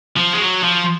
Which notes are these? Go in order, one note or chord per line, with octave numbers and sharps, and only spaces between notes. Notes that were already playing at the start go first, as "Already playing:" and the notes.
F3
G#3
F#3
F3